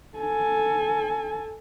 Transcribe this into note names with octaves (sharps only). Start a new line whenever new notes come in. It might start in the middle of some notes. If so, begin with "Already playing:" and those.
A4 G#5